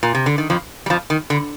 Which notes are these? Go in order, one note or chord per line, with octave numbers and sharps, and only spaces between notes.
A#2
C3
D3
D#3
F2 F3
G3
F2 F3
D#3
D3